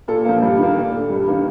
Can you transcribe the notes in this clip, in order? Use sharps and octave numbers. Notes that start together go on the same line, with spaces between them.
A#2 A4
F3 A#3
G2
D#3 A#3
A#2
A3
G2
D#3 A#3